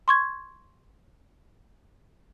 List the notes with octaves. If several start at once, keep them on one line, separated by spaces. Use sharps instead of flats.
C6 C#6 G#6